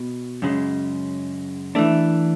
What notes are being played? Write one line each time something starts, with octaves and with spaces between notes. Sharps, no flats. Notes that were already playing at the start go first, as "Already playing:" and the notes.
Already playing: B2
F#2 C#3 G#3
E3 A3 D4